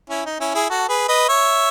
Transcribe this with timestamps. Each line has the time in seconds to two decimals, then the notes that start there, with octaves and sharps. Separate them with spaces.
0.09 C#4 E4
0.25 D#4
0.40 C#4 E4
0.54 E4 G#4
0.70 F#4 A4
0.88 G#4 B4
1.08 B4 D#5
1.28 C#5 E5